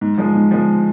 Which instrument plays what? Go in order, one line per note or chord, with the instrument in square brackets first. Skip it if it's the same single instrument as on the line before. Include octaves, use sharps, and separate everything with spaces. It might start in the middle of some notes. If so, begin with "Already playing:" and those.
[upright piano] G#2
F3 G#3
G#2
F3 G#3